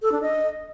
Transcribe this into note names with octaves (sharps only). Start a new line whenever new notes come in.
A4
D4
D#5